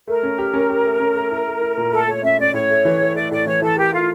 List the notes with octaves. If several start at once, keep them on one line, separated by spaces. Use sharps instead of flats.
A3 A#4
C#4
G4
C#4
G4
A3
C#4
A3
E4
A3
E4
A#2
A3 A4
A3 C#5
C#4 E5
C#4 D5
A2 C#5
A3
E3
A3
A3 D5
A2 D5
E3 C#5
E3 A4
G4 A#4
A3 F4